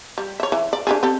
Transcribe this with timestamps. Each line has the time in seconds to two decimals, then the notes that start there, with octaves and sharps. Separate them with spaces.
0.18 G3
0.40 C#5 E5
0.52 E3
0.73 D5
0.87 D4 G4 G#4
1.03 C4 G4 A4